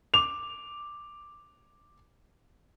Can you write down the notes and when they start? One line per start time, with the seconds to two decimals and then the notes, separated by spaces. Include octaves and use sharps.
0.14 D6 F7